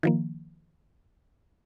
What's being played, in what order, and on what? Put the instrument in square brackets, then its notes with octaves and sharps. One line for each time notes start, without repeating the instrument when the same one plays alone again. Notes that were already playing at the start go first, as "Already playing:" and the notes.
[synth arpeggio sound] D#3 F3 A#3